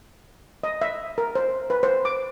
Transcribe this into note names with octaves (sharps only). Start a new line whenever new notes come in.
D#5
E5
A#4
C5
B4
C5
D6